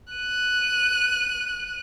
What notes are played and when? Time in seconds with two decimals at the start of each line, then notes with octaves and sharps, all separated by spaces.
0.13 F#6 D#7